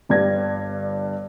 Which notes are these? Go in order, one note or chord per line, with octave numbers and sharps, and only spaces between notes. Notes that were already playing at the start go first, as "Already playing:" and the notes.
G1 G2 G3 G#6 A#6